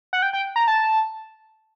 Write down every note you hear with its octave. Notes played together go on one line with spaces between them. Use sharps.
F#5
G5
G5
A#5
A5